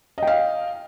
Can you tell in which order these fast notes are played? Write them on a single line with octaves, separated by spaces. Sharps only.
D#5 G5 F5